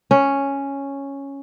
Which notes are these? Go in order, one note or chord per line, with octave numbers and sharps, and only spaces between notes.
C#4